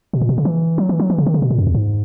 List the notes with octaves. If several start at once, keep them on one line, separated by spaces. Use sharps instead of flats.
B2
A#2
B2
C#3
E3
F#3
E3
F#3
E3
C#3
D#3
C#3
B2
A#2
F#2
E2
G#2